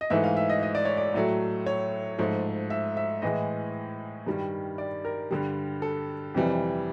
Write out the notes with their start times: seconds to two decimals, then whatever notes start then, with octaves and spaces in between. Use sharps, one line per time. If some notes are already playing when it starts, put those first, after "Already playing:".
0.01 D#5
0.10 G#2 E3 A3 E5
0.24 F5
0.37 E5
0.50 D#5
0.63 D#5
0.75 D5
0.85 C#5
0.97 D5
1.14 A2 F#3 A3
1.66 C#5
2.18 G#2 F3 A3
2.70 E5
2.97 E5
3.22 A2 E3 G#3 D#5
4.27 G2 D#3 G3
4.78 D5
5.05 A#4
5.31 G2 D3 G3
5.82 A4
6.34 F2 C3 E3 G3